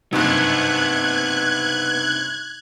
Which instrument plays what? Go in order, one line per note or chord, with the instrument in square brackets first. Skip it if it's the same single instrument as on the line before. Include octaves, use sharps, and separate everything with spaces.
[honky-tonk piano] F#1 G2 C3 [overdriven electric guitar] B3 [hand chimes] D#4 [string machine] F#6 G#6